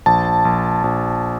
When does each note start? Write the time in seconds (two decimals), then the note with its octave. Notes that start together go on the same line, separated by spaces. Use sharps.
0.06 A#1 A5
0.45 A#1
0.84 A#1